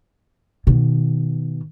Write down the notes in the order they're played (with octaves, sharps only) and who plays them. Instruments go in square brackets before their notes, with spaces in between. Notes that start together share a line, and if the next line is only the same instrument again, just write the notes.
[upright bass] B2 D#3